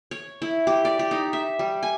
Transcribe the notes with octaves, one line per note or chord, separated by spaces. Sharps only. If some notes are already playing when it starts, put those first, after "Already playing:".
C#5
E4
G4
D5
G4
D#4
E5
G3
G#5